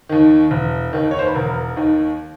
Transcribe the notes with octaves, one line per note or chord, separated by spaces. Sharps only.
D#2 D#3
E1
D#2 D#3
C#5
C5
B4
E1 A#4
D#2 D#3